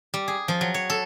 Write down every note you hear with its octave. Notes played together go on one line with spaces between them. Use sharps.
G3
G#4
F3
F#3
C#5
A4